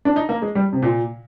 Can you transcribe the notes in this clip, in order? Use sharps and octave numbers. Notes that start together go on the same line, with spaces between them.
D4
D#4
A#3
G#3
G3
C3
A#2